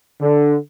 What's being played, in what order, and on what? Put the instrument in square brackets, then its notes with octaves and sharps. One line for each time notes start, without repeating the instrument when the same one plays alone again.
[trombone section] D3